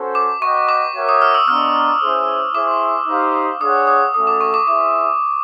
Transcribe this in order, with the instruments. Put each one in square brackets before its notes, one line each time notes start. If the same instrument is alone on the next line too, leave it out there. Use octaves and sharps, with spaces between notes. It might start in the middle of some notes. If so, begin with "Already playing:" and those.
Already playing: [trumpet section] C#4 F#4 A4 C5
[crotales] D6
[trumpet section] F#4 B4 D#5 G5 [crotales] C#6
[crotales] D6
[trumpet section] F#4 A#4 C#5 E5 G5
[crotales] D#6
F6
E6
[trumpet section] B3 D4 F4 A#4 D#5 [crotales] F6
[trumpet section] C#4 E4 G#4 C5
[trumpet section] E4 G#4 C5 [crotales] D6
[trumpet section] D#4 G4 C5 F5
[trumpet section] D4 F4 G#4 C#5 F#5 [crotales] D#6
[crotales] D#6
[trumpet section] A3 C#4 F#4 A4 [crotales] D#6
[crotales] D6
C#6
D6
[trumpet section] E4 G#4 C5 E5 [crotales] D6